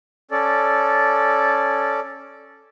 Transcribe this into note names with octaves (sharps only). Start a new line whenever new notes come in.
C#4 A4 D5